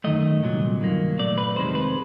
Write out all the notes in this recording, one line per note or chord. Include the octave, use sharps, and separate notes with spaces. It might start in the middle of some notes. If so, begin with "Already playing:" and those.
F#2 D#3 F#3 A3 D#5
C2 A#2 F#3
G2 D#3 F#3 A#3
A#2 F#3 A3 D5
B4
F2 C3 D#3 G#3 C5
B4